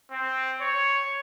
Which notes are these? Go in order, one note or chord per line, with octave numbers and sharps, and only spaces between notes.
C4
C#5